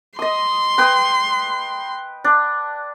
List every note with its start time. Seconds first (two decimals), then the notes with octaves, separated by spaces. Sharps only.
0.19 D#5 C6 D#6
0.78 B4 G5 D#6
2.24 D4